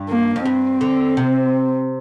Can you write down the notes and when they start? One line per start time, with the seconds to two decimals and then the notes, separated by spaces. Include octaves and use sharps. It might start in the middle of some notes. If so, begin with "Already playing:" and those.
Already playing: G2
0.10 A#3
0.36 F2
0.45 G2 C4
0.81 D3
1.17 C3